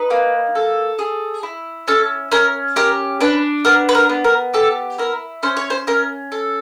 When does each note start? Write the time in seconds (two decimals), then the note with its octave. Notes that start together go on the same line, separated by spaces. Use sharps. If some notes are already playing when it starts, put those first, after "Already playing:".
Already playing: D#4 B4
0.11 A#3
0.55 A4
0.99 G#4
1.43 E4
1.88 C#4 A4
2.32 C#4 A#4
2.76 G4 A#4
3.20 D4 B4
3.65 B3 A#4
3.89 B4
3.95 A#4
4.09 B3
4.24 A#4
4.54 G4 A4
4.98 E4 A#4
5.43 C#4 C5
5.57 C#5
5.70 C5
5.87 C#4 A#4
6.32 A4